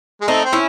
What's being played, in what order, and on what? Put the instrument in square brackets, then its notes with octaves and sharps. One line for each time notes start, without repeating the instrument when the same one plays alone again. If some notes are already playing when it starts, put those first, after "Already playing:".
[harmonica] G#3
[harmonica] A3 [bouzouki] C4 D#4
[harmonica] C4
[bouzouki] C#4 E4